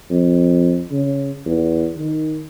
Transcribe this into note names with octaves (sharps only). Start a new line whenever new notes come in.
F2
C#3
E2
D#3